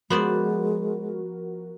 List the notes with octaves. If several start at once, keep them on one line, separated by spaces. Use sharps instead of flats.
F3 G#3 B3 F#4 A#4 C5 D5